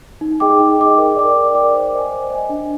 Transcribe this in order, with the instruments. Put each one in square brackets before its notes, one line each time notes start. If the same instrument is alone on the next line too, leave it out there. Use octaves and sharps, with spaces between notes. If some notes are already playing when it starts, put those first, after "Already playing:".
[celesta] D#4
G#4 D#5 G5 D6
D#4
G#4 D#5 G5 D6
A#4
D5 G5 D6
A#4
D5 G5 D6
C5
D#5 G#5
C5
D#5 G#5
D4